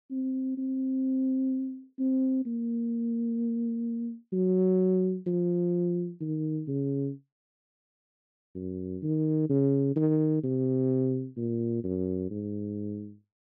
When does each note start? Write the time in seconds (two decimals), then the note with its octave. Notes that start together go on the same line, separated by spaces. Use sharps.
0.11 C4
0.58 C4
1.99 C4
2.46 A#3
4.33 F#3
5.27 F3
6.20 D#3
6.68 C#3
8.55 F#2
9.02 D#3
9.49 C#3
9.96 D#3
10.43 C3
11.37 A#2
11.84 F#2
12.31 G#2